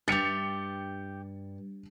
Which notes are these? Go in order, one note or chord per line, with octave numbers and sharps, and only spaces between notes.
G2 G4 E5 A6 C#7 F7